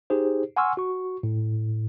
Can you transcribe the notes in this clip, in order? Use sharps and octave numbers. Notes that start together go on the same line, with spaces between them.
D#4 G4 G#4 C5
F#5 G#5 C6 C#6 E6 F6
F#4 C#6
A2